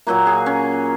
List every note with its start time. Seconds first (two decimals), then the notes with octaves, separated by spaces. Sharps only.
0.07 A#2 F#3 A#3 F#4
0.27 G#4
0.46 C#4